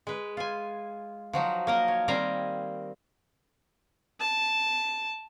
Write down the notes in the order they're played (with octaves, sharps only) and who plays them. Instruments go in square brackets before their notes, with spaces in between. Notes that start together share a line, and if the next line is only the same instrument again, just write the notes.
[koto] G#3 B4
F4 G#5
F3 F#3 D#4
A#3 A#4 D#5
C#5
D#3 G3 C4 F5 G#5 A#5
[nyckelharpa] A5